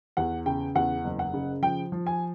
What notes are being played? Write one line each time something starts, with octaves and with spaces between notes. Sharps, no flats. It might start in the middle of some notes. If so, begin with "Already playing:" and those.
E2 F#5
C#3 G5
E2 F#5
F#1
F#5
C#3
F3 G5
F3
G#5